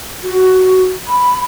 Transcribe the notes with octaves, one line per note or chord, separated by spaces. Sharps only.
F#4
B5